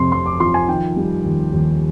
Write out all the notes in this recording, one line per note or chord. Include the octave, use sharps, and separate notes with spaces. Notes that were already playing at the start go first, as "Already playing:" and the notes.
Already playing: F2 C3 C6
F1 C6
D6
F3 C6
G#5
D#3 G5
G3
D#2
D#2